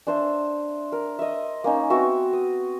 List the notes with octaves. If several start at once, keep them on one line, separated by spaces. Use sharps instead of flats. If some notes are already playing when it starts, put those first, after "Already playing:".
D4 C5 E5
A#4
D#5 E5
A#3 C#4 D#4
B3 C4 F#4 E5
D#6